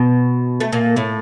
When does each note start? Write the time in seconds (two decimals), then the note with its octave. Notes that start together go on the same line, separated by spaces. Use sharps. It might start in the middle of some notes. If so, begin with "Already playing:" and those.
Already playing: B2 B3
0.60 A3
0.72 A#2 A#3
0.96 A2 A3